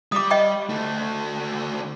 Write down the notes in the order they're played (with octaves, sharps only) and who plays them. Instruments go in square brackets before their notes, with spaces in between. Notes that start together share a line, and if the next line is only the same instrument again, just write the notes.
[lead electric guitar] G3 [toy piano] D6 D#6
[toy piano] D#5 G5 C#6
[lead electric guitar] D2 A3